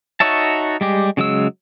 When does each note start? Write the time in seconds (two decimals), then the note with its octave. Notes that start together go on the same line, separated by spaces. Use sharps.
0.20 D#4 F#4 C#5 E5 A5
0.81 G3 G#3 G4
1.17 C#3 F#3 G#3 E6